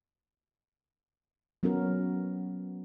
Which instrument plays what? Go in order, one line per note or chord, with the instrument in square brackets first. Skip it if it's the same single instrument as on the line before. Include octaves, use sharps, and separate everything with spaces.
[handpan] F#3 B3 C#4 F#4 A#4